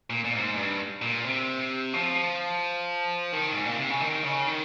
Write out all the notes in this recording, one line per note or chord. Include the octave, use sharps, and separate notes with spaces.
A#2
A#2
G#2
G2
A#2
C3
F3
D#3
G#2
A#2
C3
C#3
D#3
C#3
D#3